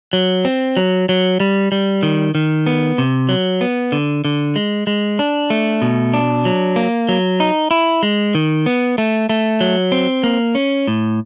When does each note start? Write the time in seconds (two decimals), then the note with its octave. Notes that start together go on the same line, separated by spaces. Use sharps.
0.13 F#3
0.45 C4
0.77 F#3
1.09 F#3
1.40 G3
1.72 G3
2.03 D#3
2.35 D#3
2.67 B3
2.98 C3
3.29 F#3
3.61 B3
3.92 D3
4.25 D3
4.56 G#3
4.87 G#3
5.19 D4
5.50 A3
5.82 B2
6.13 D4
6.45 F#3
6.76 A#3
7.09 F#3
7.40 D#4
7.71 E4
8.03 G#3
8.35 D#3
8.66 B3
8.98 A3
9.29 A3
9.61 F#3
9.92 C4
10.24 A#3
10.55 C#4
10.88 A2